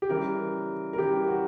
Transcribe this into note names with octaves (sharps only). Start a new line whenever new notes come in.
G4
C#3 E3 G3 A#4
A#4
C#3 E3 G3 G4
F#4